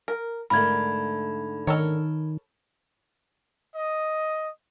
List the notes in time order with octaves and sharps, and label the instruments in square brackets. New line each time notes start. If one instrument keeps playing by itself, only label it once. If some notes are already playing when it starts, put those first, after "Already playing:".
[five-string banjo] A#4
[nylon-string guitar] G#2 D3 A3 [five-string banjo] A#4 [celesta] B5 G#6
[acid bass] D#3 [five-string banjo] A4 A#4 C#5
[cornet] D#5